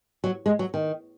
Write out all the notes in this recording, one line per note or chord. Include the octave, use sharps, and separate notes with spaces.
F#3
G#3
F#3
D#3